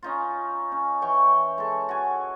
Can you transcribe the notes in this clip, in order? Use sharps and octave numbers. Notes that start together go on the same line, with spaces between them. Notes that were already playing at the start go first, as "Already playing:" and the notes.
C#4 D#4 F4
C#4
E3 C#5 G5 C#6
G#3 A4
F#4 G#5